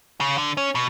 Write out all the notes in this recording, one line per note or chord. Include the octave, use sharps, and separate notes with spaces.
C#3
D3
C#4
B2